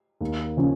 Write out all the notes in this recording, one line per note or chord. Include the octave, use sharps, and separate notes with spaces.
D#2
C#3 F3 C#4